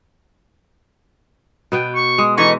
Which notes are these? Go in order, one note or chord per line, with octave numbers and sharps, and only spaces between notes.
B2 B3 G5
C#6
G#3 D#6
E3 A3 D#4 D#5 C#6